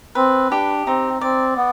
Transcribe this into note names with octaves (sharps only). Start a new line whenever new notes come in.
C4 B4
D4 G4
C4 D#4
C4 D5
B3